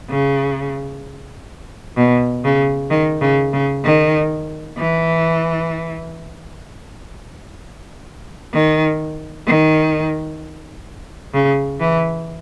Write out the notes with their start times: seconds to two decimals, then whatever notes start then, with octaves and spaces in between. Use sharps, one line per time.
0.10 C#3
1.97 B2
2.44 C#3
2.90 D#3
3.22 C#3
3.53 C#3
3.84 D#3
4.78 E3
8.53 D#3
9.46 D#3
11.34 C#3
11.81 E3